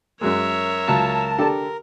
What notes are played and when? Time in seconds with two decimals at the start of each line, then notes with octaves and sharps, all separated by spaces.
0.21 F#2 F#3 G#3 A#4 C#5 E5
0.88 C#2 F#3 A5 A#5
1.39 D3 G4 A4